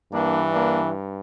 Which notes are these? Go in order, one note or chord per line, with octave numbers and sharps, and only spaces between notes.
G2 E3 A#3 D4
A#3 D4